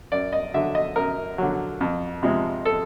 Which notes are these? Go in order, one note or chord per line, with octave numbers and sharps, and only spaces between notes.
F#2 D5
D#5
D3 F#3 E5
D#5
F#2 A#4
D3 F#3
F2
C3 F3 G#3
A4